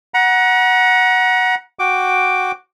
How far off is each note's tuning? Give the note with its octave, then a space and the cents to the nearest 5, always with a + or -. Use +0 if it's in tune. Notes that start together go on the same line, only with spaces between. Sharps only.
F#5 +0 A#5 +40
F#4 +0 G5 +0 D6 +0